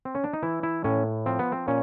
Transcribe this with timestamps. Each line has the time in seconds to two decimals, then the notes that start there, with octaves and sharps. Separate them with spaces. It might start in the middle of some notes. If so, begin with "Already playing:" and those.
0.05 C4
0.15 C#4
0.24 D4
0.33 D#4
0.43 E3 E4
0.63 E4
0.84 A2 C#4
1.26 F3 C4
1.39 B3
1.52 C4
1.68 A#2 C#4